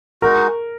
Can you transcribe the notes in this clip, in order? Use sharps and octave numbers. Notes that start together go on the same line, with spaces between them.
G#3 D#4 F#4 A#4